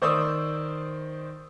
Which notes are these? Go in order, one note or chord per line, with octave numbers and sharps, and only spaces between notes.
D#3 C5 D5 C#6 D#6 E6